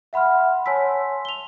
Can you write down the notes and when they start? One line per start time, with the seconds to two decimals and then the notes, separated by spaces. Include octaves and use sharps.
0.13 E5 F#5 B5 C6 F6
0.66 C#5 G#5 A5 C6 E6 B6
1.25 F7 G7